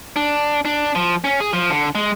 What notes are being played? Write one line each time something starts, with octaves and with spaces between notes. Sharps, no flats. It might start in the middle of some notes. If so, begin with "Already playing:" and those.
D4
D4
F3
C#4
G#4
F3
D3
G#3